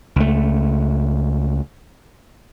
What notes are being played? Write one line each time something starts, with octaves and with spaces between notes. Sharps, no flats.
C#2 A3